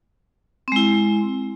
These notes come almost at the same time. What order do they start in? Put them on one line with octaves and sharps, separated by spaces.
C4 G#3 E4